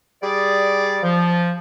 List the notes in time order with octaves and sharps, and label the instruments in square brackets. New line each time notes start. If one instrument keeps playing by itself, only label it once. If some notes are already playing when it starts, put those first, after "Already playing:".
[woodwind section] G3 G#4 D5
F3